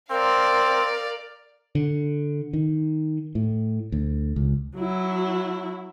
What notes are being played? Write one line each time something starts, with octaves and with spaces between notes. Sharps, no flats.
C4 A#4 D5 F5
D3
D#3
A2
D2
C#2
F#3 E4